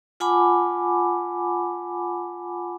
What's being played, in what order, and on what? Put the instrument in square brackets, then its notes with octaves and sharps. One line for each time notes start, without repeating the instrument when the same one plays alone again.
[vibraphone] F4 F#5 G#5 A5 B5 D6